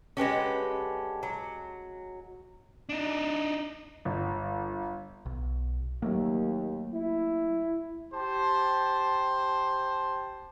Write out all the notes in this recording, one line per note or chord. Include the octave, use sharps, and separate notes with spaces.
D3 G#3 C#4 G4 B4
F#3
D4 D#4
G1
B1
D#2 F#3 A3 A#3
E4
G4 C5 A5